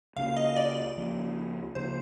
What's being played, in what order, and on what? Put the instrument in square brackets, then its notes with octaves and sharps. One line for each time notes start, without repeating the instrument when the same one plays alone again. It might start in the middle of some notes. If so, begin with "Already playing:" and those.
[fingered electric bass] C#2 C#3 F3 A#3 [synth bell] F5
[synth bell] D#5
D5
[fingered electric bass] C#2 C#3 F3 A#3
[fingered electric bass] C#2 C#3 F3 A#3 [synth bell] C5